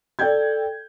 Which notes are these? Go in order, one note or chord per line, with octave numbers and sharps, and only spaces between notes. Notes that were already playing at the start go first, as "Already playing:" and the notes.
A4 D5 G5 G6 G#6